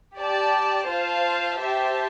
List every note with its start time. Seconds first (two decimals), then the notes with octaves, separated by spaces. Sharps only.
0.18 G4 D5 A5
0.88 F4 C5 F5 A5
1.59 G4 C5 E5 A5